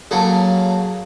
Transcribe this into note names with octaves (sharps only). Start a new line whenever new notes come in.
C#3 F#3 A#3 A4